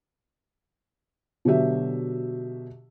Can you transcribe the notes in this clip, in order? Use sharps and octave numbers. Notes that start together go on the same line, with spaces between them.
B2 D3 F#3 G4 E5